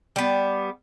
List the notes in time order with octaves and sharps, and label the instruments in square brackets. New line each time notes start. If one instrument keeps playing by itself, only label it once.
[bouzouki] G3 B3